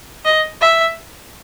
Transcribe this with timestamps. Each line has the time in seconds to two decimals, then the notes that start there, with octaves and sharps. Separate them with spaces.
0.25 D#5
0.61 E5